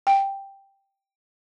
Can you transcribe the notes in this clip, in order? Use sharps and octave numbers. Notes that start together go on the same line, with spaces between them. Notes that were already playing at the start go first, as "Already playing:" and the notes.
G5